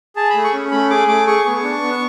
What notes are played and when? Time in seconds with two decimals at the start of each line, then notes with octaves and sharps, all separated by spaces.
0.16 G#4 A5
0.30 A3 B5
0.44 C#6
0.53 C#4
0.72 A3 B5
0.90 G#4 D6
1.08 A3 D6
1.27 G#4 C#6
1.45 B3
1.64 D4
1.82 B3